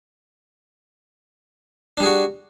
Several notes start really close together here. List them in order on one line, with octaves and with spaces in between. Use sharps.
D4 G3 G#4 F#4